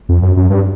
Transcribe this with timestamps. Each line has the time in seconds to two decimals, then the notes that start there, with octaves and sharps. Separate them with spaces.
0.09 F2
0.22 F#2
0.37 F#2
0.50 G2